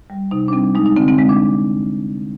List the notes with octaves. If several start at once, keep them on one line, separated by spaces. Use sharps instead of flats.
G3
C3 D#4
D4
G3 C4
G#3 D#4
D#4
D3 C4
C4
G#3 C4
D4